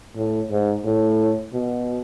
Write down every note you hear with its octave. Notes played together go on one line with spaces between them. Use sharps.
A2
G#2
A2
B2